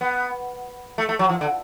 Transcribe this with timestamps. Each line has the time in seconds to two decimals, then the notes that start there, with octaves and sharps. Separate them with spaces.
0.01 B3
0.98 A3
1.09 A3
1.19 F#3
1.29 F3
1.41 D3